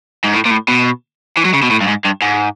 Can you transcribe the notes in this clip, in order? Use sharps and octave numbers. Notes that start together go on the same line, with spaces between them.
G#2
A2
A#2
A2
B2
E3
F#3
C#3
B2
A2
G2
G#2
G2
G#2